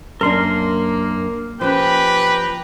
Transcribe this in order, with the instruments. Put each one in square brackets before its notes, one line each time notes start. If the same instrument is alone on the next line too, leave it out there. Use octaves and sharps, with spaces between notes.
[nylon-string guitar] F#2 D4 [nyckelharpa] A#3 [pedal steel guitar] A#4 C6
[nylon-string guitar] F3 C#4 [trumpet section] G4 B4 [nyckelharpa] G5 A#5